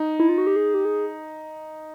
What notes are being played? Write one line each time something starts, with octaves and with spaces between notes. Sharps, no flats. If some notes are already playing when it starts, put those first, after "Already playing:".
Already playing: D#4
E4
F4
F#4
G4
G#4
G4
G#4